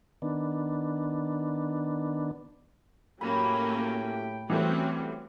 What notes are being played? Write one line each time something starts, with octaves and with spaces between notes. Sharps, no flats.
D#3 B3 D4
A2 F#3 A#3 C#4 G4 G5 B5
E3 G3 A3 C4 C#4 F#4